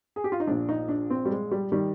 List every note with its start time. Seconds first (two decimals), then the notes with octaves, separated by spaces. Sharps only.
0.16 G#4
0.24 G4
0.32 F4
0.40 D#4
0.47 A#1 A#2 D4
0.69 D#4
0.89 D4
1.10 C4
1.25 G3
1.31 G#3
1.51 G3
1.72 D#3 G3